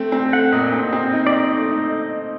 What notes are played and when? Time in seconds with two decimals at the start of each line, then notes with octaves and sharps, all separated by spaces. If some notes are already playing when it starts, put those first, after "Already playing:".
Already playing: A3 C4
0.12 C4
0.33 A3 F#5
0.53 A#2 D#5
0.73 C4
0.93 C4
1.13 D#4
1.27 D5
1.32 D#4 D#5
1.53 A3
1.72 D#4